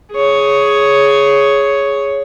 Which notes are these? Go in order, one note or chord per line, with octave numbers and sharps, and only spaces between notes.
G#4 C#5